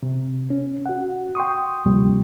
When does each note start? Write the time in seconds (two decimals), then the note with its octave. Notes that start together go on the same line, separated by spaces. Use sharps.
0.03 C3
0.50 C#4
0.86 F#4 F#5
1.35 G5 C6 C#6 D#6
1.86 D2 C3 F3 G3 A#3